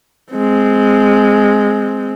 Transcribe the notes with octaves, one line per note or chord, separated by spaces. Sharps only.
G#3 C4